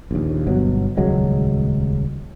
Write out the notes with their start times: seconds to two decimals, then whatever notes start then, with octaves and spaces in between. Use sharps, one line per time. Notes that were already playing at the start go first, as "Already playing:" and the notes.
0.11 A#1 D#2
0.47 G1 B2 F#3
0.97 D#1 C#2 F#3 G#3